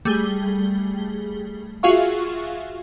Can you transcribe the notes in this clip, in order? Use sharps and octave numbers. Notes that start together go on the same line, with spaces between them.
G3 A3 G#4 G7
F4 F#4 G#4 E5 F5 C#6